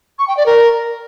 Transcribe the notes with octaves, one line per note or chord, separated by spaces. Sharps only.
C#6
G5
D5
A#4